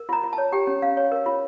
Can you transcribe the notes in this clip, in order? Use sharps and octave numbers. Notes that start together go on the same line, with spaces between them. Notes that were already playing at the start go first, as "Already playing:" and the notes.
Already playing: A#4
F4 A#5
F4
A5
C#5
G4 G5
C#4
C#4 F5
C#5
A#4
F4